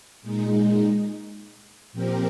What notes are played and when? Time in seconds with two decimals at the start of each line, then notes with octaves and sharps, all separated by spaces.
0.22 A#2 G#3 D#4
1.93 A#2 F3 C4 G4 A#4